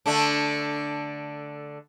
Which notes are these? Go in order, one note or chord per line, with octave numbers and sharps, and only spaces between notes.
D3 A3 D4